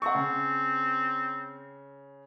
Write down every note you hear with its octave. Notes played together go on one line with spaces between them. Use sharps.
C4 F#5 C#6
C#3